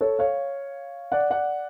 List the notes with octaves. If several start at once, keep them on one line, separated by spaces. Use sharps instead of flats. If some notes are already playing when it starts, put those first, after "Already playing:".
A4 C#5
C#5 F5
D5 F#5
D5 F#5